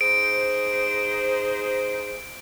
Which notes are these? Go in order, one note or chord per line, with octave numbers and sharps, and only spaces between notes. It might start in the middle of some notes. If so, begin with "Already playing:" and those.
D#4 G#4 C5 D7